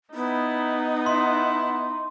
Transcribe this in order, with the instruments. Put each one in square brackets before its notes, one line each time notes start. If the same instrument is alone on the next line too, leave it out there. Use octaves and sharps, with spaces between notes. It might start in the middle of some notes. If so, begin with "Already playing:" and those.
[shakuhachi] B3 [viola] D#4 [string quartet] E4
[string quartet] E4 F#5 [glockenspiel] C6